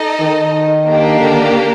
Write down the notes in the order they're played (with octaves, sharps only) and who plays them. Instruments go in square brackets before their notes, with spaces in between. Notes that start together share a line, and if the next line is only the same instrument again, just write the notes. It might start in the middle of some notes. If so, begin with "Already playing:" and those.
Already playing: [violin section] D#4 A4 D#5
[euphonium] D#3
[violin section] A#3 D4 G4
[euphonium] D3